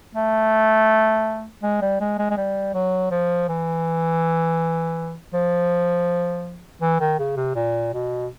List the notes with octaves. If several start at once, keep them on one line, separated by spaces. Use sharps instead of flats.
A3
G#3
G3
G#3
G#3
G#3
G3
F#3
F3
E3
F3
E3
D#3
C#3
C3
A#2
B2